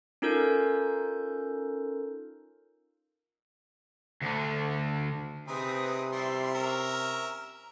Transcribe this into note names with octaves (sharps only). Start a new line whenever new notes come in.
C#4 D#4 F4 A4 A#4 G6
D2 D3
C3 C4 D#4 G#4 B4 D#6
G3 E4 E5 C6
C#4 A#4 E5 A#5